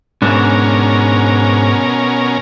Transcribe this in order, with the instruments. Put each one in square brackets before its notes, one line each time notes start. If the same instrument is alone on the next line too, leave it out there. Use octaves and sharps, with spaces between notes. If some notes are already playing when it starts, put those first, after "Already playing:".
[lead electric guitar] G#2 D4 [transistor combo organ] B2 C#4 A#4